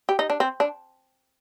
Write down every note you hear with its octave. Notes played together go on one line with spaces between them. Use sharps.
G4
D#4
D4
C4
D4